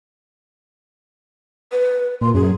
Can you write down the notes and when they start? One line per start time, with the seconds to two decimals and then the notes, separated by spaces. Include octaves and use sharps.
1.72 B4
2.21 A#2 C6
2.34 F#2 G#4